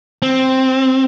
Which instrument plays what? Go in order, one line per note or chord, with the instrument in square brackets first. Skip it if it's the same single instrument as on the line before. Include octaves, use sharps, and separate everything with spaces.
[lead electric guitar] C4